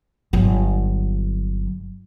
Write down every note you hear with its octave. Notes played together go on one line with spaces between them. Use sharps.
G1 F#3